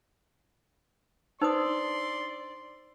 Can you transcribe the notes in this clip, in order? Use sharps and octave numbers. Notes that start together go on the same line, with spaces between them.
D4 D#4 B4 C5 D5 C6 D#6 E6